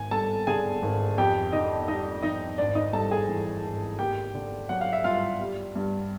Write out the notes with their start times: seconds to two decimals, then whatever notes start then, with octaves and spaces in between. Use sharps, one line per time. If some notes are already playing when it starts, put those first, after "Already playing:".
Already playing: G#1 G#5
0.11 G2 A4 A5
0.47 D3 G#4 G#5
0.83 G#1
1.18 F2 G4 G5
1.52 D3 D#4 D#5
1.88 G3 D#4 D#5
2.23 F2 D#4 D#5
2.58 G#1 D4 D5
2.75 D#4 D#5
2.93 G2 A4 A5
3.11 G#4 G#5
3.29 E3
3.64 G#1
3.99 A#3 G4 G5
4.34 D3
4.69 F#3 F#5
4.81 F5
4.93 E5
5.04 G2 F4 F5
5.40 G3
5.76 G2